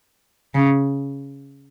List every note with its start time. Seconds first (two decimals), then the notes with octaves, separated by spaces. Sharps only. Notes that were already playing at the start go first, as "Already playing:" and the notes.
0.55 C#3